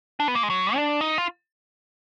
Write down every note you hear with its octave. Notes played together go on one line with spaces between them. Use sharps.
D4
B3
A#3
G#3
F#3
D4
D#4
F4